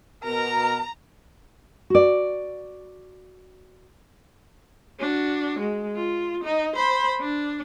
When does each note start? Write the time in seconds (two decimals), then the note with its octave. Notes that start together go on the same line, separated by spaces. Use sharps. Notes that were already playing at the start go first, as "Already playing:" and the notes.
0.24 B2 A#4 A#5
1.90 F#4 D5
5.00 D4 F#4
5.59 G#3
5.95 F4
6.44 D#4
6.76 C5 B5
7.21 D4